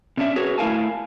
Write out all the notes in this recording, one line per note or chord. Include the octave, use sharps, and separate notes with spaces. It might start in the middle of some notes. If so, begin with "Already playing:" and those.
C3 C#4 D4 E5
F#4 G#4 A#4 B4 C#5
A3 E4 A#4 F5 G#5 A5